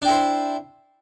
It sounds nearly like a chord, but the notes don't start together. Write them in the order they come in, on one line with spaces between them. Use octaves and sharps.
D4 G5 E4 C5